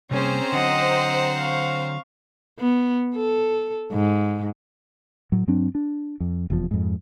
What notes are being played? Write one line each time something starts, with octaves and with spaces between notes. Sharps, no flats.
C3 G3 A#3 C4 C#4 G#4 C5 A#5
D3 F#3 D#5 F#5
F5 C#6
B3
A4
G#2
A2 F#3
G2 F#3 C4 D4
D4
F2
F1 E2 B2 F3
F2 G#2